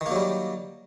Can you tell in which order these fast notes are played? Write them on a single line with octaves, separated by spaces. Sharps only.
D#3 A#3 F#3 G3